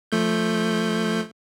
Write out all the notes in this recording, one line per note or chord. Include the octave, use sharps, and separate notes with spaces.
F3 A3 G6